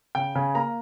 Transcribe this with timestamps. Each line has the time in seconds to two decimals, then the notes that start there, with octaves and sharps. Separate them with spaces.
0.15 C#3 G5
0.35 C#3 G#5
0.54 A#3 A#5